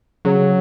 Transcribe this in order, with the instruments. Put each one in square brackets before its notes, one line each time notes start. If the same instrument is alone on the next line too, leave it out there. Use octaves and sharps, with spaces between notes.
[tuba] C#3 [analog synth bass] F#3